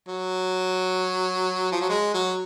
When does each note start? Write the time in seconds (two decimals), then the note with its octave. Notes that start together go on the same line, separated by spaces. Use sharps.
0.08 F#3
1.72 F3
1.81 F#3
1.89 G#3
2.14 F#3